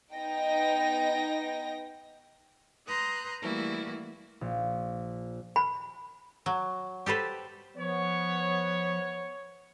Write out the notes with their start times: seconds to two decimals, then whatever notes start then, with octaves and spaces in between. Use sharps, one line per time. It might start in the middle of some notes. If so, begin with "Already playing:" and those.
0.14 B3 D#4 D#5 G5 A#6
2.88 B4 A#5 C6 D#6 F#6 G6
3.42 E3 G3 A3 A#3 E4 F#4
4.41 A#1
5.56 B5
6.46 F#3
7.06 G4 A4 B4 C5
7.77 F3 B3 C#5